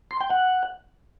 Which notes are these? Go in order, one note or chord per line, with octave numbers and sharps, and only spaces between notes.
C6
G5
F#5